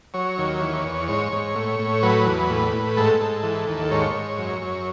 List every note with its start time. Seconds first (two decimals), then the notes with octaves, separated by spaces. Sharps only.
0.14 F#3 C#5
0.38 D#2
0.61 E3
0.85 E2
1.08 G#2 C#5
1.32 G#2
1.56 A2
1.79 A2
2.03 F#3 B4
2.26 E2
2.50 A2
2.73 A2
2.97 G#2 A4
3.21 G#2
3.43 E3
3.67 D#2
3.91 G#2 C#5
4.15 G#2
4.38 F#2
4.62 F#2